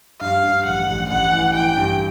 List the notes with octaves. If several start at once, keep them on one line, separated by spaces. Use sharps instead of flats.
G2 F5
G2
A1 F#5
A1
A1 F#5
E3
E3 G5
G2